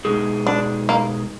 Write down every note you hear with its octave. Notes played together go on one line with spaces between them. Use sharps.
B2 G#3 D#4 G#4
D4
A#3